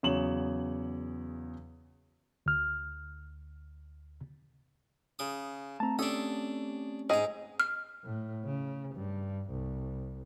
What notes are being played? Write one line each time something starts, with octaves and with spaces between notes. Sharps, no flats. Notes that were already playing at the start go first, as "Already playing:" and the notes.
E2 C#3 F#3 C#5 E7 F#7
D2 F6
C#3 D#6
A3 C4 A5 A#5
C#4 D4 G4 A4 D5 D#6
G#2 G#4 D#5 A#5
F6
A2
C#3
G2
C2